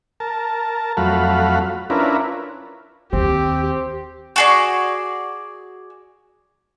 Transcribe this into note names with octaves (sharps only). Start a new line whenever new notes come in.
A#4 A5
F2 F#3 A3 F#4 F5 B5
C#4 D4 E4 F4 A#4 B4
D#2 C4 G4
F#4 G#4 D5